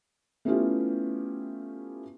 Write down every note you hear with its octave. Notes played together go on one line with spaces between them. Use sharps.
A3 B3 C#4 E4 F4 G4